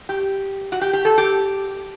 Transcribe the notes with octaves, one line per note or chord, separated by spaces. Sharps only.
G4
F#4
G4
G4
A4
G4